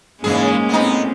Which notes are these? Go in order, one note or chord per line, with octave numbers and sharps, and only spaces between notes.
G#2 C#3 E3 G#3 A#3 C#4 G#4
A2 B3 C4 D#4